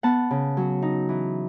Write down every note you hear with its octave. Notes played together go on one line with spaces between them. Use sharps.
B3 F#5 A5
C#3
F#3
D#4
E3